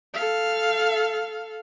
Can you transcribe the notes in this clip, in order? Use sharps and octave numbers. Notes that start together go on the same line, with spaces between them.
A4 F5